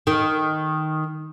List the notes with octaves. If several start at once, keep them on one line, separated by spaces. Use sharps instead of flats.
D#3